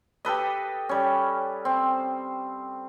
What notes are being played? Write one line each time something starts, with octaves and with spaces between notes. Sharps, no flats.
G4 A4 B4 D#5
G3 C#4
C4